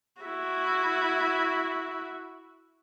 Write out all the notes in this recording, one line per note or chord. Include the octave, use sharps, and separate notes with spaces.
E4 F#4